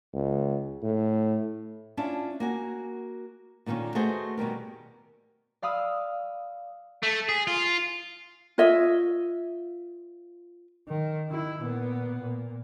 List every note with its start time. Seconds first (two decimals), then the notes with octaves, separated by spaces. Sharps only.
0.14 C#2
0.83 A2
1.97 C#4 D4 E4 F4 A5
2.40 A#3 F#4 G#5
3.66 A#2 D3 D#3 A#3 C#4
3.95 A3 F#4 G#4 B4 C5 D#5
4.37 B2 D#3 G3 A#4
5.62 D5 F5 B5 D#6 E6
7.03 A3
7.29 G#4
7.47 F4
8.58 F4 C#5 D#5 E5
10.88 D#3
11.29 D#3 E4
11.62 A#2 B3
12.21 A#2